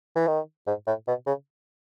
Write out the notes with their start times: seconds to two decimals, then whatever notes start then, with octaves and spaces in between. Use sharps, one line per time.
0.16 E3
0.27 D#3
0.67 G#2
0.87 A2
1.08 B2
1.27 C#3